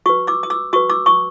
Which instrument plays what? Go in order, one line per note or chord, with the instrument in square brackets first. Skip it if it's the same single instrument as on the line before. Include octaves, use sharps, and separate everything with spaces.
[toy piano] F#4 B4 C#6 D#6
D6 E6
D#6
D6 E6
F#4 B4 C#6 D#6
D6 E6
C#6 D#6